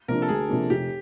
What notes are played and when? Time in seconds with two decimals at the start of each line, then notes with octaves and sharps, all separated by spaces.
0.08 C3 F3 A#3 D4 A#4
0.22 A4
0.29 D2 G#4
0.49 C3 F3 A#3 D4
0.70 F1 G4